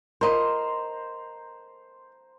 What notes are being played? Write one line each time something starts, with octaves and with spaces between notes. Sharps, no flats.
A#4 C5 D#5 A#5 C6